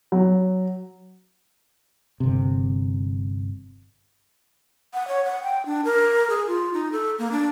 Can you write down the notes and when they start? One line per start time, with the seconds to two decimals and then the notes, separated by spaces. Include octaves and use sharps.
0.12 F#3
2.20 G1 C3
4.94 F#5
5.08 C#5
5.25 F#5
5.43 G5
5.66 D4
5.85 A#4
6.30 G#4
6.47 F4
6.73 D#4
6.92 A4
7.19 A#3
7.31 D4